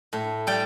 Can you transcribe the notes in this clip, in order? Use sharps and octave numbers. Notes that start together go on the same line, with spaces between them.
A2
G3 G5